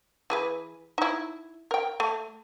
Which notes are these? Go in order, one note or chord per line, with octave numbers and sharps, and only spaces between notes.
E3 G#4 B4
D#4 E4
A#4 G5
A3